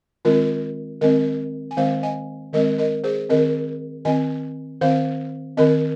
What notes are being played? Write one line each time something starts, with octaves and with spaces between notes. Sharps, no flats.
D#3 G#3 C4 F4 A#4
D#3 G#3 C4 A#4 D#5
G#5
D#3 G#3 C4 C5 F5
D#5 G#5
D#3 G#3 C4 A#4 D#5
A#4 D#5
G#4 C5
D#3 C4 A#4 D#5
D#3 C4 D#5 G#5
D#3 C4 C5 F5
D#3 C4 A#4 D#5